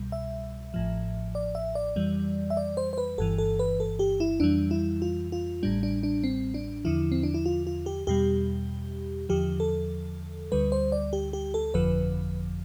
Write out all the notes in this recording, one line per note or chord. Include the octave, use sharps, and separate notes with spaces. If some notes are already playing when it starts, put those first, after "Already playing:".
Already playing: C2 B2 G3
E5
A1 A2 F3
D5
E5
D5
F2 E3 G3
E5
D5
C5
C5
B4
G1 G2 E3 A4
A4
B4
A4
G4
E4
F2 E3 G3 D4
E4
F4
F4
A1 A2 G3 D4
D4
D4
C4
D4
E2 D3 F3 E4
C4
D4
E4
F4
F4
G4
E2 B2 G3 G4
E2 D3 F3 G4
A4
D2 D3 G3 B4
C5
D5
G4
G4
A4
G1 F2 D3 F3 B4